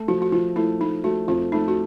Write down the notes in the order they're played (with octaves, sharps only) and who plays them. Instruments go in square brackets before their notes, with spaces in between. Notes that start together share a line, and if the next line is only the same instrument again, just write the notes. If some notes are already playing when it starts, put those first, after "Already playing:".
Already playing: [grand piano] A3
[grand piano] F3 [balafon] F#4
[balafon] F#4
[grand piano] F3 [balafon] F4
[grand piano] A3 [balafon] E4
[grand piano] A3 [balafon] D#4
[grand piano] A3 [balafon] F#4
[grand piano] F2 [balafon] F4
[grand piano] A3 [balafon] D#4
[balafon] F#4